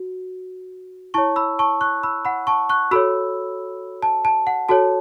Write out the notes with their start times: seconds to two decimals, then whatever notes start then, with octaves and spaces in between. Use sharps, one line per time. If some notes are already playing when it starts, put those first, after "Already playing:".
Already playing: F#4
1.14 E4 C#5 A5 C#6
1.36 B5 E6
1.59 A5 C#6
1.81 C#6 F#6
2.03 B5 E6
2.25 F#5 B5
2.47 A5 C#6
2.69 C#6 F#6
2.91 F#4 A4 C#5 B5 E6
4.03 A5
4.25 A5
4.47 F#5
4.69 F#4 A4 C#5 A5